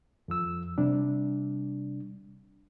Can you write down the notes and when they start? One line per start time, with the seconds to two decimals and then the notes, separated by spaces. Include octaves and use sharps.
0.28 F2 F3 E6
0.78 C3 G3 D4